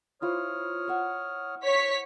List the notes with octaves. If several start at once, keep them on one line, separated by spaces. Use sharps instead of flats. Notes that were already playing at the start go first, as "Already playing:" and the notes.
E4 F4 C5 C#5 D#6 F6
E5 F#5
C#5 B6